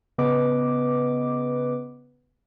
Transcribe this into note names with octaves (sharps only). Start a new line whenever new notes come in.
C#3 B3 B4 D#5 D6